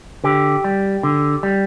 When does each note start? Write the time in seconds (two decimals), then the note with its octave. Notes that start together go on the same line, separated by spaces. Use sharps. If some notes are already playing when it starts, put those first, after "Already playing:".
0.24 D3 G4
0.64 G3
1.03 D3
1.43 G3